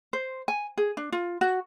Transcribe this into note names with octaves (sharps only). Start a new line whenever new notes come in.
C5
G#5
G#4
D4
F4
F#4